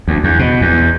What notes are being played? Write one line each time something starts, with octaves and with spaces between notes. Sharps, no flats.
D2
E2
B2
E2